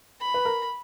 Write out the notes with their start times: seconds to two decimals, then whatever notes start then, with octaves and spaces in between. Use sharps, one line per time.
0.20 B5
0.34 B4
0.45 A#4